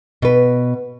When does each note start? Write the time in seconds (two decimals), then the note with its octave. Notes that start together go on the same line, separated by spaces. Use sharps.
0.22 B2 B4